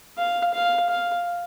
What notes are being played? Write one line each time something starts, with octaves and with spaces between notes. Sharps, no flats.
F5
F5
F5